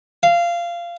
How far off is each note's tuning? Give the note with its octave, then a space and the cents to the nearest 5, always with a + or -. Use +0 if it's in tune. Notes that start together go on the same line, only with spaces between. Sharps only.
F5 -20